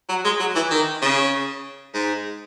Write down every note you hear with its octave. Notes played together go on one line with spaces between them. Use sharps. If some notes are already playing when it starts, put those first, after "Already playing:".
F#3
G#3
F#3
E3
D#3
C#3
G#2